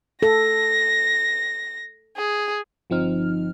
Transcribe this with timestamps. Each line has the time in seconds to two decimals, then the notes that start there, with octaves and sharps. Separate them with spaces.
0.22 A4 A#6
2.17 G#4
2.90 G1 F3 C4 D#4 F6